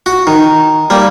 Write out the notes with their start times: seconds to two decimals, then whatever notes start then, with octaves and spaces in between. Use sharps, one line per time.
0.06 F#4
0.27 D#3
0.90 G3 A#3